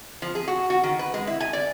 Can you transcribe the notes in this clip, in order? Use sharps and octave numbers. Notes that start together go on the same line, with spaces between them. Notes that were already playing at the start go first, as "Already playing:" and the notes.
F3
G#4
F#4
F#4
D#3
B4
G#3
E4
G#5
D5